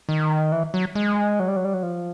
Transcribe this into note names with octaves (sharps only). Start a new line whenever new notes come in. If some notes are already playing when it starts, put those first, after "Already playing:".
D#3
E3
F#3
G#3
F#3
G3
F#3
G3
F#3
F3